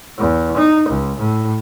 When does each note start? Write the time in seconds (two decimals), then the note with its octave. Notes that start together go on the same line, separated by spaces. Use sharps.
0.18 E2
0.57 D#4
0.89 C#2
1.18 A2